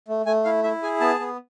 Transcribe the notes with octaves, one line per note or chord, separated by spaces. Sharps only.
A3
A3 G#5
E4 F5
E4 E5
G#4 G#5
B3 A5
B3